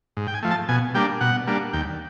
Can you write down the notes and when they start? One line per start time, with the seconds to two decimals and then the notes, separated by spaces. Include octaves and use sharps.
0.17 G#2
0.27 G5
0.34 G#5
0.43 F3 A3
0.51 A5
0.69 B2 G#5
0.95 G3 A#3 D4 G5
1.21 B2 F#5
1.47 G3 A#3 D4
1.73 D#2 G5